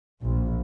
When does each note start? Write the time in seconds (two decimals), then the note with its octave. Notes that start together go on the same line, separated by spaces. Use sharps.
0.22 A#1